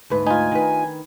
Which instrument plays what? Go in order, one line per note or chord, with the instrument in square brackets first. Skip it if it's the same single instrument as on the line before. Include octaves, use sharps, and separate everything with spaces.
[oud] D2 G#2 B4
[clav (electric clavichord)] D#4 F4 [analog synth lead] G#5
[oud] D#3 B4